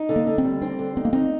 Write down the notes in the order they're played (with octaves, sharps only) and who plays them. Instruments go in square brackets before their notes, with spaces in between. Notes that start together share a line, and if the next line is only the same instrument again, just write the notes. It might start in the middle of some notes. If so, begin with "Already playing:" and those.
Already playing: [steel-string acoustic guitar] D#4
D3
[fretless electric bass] A#3
[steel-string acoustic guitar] D3
[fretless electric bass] C4
[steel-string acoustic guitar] G3
[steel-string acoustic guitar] C4 [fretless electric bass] D4
[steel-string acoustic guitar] D3
[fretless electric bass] C4 [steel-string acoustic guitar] D#4
[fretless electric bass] A#3
[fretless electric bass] C4 [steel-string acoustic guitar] D#4